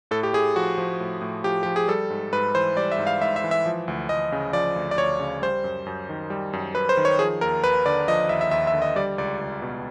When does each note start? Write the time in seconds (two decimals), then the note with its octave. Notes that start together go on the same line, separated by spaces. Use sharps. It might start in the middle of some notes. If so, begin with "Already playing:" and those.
0.11 A2 A4
0.23 G4
0.33 A2 G#4
0.56 F3 F#4
0.78 F3
1.00 A2
1.22 A2
1.44 F3 G4
1.63 F3 G4
1.76 G#4
1.88 G3 A4
2.10 G#2
2.33 G#2 B4
2.55 E3 C5
2.77 G3 D5
2.91 E5
2.98 G#2
3.07 F5
3.21 G#2 E5
3.36 E5
3.44 E3
3.51 E5
3.66 F3
3.88 D2
4.09 D2 D#5
4.32 C#3
4.53 F3 D5
4.76 D2
4.91 D5
4.98 D2 C#5
5.20 C#3
5.42 G3 C5
5.64 F#2
5.86 F#2
6.09 D#3
6.30 G3
6.53 F#2
6.75 F#2 B4
6.89 C5
6.97 D#3
7.05 C#5
7.19 F3 G#4
7.41 D#2 A#4
7.63 D#2 B4
7.86 D3 D5
8.08 F3 D#5
8.29 D#2 E5
8.41 E5
8.51 D#2 E5
8.67 E5
8.73 D3
8.82 D#5
8.96 G3 D5
9.18 C#2 D5
9.41 C#2
9.62 B2